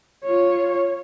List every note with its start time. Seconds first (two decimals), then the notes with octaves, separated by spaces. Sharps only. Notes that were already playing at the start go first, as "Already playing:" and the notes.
0.24 F4 C#5